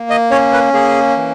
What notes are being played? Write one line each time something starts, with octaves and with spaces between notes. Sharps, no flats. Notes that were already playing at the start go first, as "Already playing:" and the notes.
Already playing: A#3
D#5
C#4 C#5
B4
A#3 G#4
E3